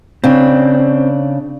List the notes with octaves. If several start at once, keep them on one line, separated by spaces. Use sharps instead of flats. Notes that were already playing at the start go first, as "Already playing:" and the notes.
C#3 C4 D4